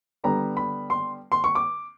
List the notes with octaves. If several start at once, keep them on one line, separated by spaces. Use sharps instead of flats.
D3 G3 B3 A#5
B5
C6
C6
C#6
D6